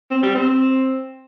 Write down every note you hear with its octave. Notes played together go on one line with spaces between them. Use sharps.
C4
G3
C4